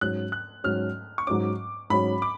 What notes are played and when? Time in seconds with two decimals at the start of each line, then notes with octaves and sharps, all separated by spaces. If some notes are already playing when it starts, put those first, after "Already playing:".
0.01 G#2 F#3 C#4 F#6
0.32 F#6
0.64 G#2 F#3 C#4 F6
1.18 C#6
1.27 G#2 F#3 C#4 D6
1.90 G#2 F#3 C#4 B5
2.22 D6